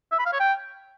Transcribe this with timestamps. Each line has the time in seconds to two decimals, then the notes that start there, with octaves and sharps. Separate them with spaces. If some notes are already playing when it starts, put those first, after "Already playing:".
0.12 E5
0.19 B5
0.26 F5
0.33 C#5
0.40 G5